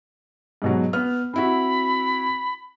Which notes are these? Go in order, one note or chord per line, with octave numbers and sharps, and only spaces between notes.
G#2 B2 F#3
B3 F6
C4 E4 F#4 B5